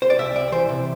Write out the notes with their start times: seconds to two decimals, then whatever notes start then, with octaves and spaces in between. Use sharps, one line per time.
0.02 C5
0.10 D5
0.18 C2 E5
0.35 C2 D5
0.52 E3 C5
0.69 C3